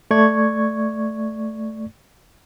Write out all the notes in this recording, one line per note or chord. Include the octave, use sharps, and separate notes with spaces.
A3 D5 C#6 G#6